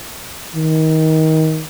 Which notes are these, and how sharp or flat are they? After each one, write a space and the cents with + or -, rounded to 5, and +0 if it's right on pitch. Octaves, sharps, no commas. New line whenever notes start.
D#3 +25